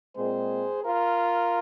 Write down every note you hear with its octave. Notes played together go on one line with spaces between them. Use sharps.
A#2 G#3 C4 G#4 C5
F4 A#4